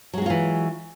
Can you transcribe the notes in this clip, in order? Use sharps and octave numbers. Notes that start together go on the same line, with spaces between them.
E3 F#3 G#3 F4 F#4